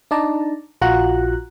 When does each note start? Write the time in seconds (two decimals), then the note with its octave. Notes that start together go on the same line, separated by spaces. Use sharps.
0.11 D4 D#4 D5 A5 A#5
0.81 A#1 F4 F#4 F#5 A#5 F#6